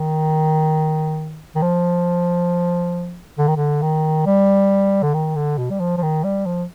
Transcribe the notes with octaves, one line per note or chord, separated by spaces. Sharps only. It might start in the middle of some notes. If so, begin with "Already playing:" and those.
Already playing: D#3
D#3
F3
D3
D#3
D3
D#3
G3
D3
D#3
D3
B2
G3
F3
F3
D#3
G3
F3